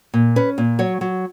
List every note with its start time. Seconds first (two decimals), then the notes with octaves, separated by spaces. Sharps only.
0.14 A#2
0.36 C#4 B4
0.58 A#2
0.79 F#3 C#5
1.01 F#3